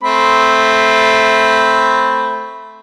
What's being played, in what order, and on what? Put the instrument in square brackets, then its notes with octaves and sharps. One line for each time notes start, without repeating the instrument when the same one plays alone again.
[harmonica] A3 C4 B5